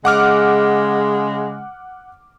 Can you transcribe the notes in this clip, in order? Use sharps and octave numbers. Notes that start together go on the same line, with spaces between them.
C#3 G#3 F#5 D6 F6